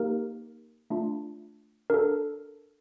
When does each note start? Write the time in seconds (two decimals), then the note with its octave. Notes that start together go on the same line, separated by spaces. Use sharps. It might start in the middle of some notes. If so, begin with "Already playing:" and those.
Already playing: A#3 D#4 G4 A#4
0.90 A3 D4 F4
1.90 D4 F#4 A4 A#4